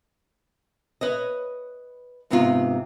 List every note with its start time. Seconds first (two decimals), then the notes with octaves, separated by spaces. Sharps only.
1.01 B4 C#5 D#5
2.30 G#2 C3 B3 D#4 F4